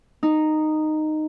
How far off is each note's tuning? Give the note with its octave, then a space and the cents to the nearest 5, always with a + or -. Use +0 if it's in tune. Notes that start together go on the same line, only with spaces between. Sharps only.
D#4 -10